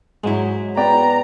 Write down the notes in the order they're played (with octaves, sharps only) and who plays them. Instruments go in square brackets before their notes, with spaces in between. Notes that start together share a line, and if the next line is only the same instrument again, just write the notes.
[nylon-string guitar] G#2 E4 [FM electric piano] F#3 G#3
[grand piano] B3 D5 G5 [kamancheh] A#5